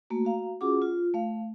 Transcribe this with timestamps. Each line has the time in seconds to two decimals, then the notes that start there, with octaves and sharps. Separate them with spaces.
0.10 A3 A#3 F#4
0.25 F#4 F5 A#5
0.61 C#4 F4 F#4 G#4 F#5 D6
0.82 F4
1.14 A3 F5